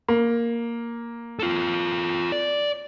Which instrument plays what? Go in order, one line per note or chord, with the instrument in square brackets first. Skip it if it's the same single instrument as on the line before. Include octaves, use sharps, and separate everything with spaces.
[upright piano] A#3
[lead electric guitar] F4 A4
D5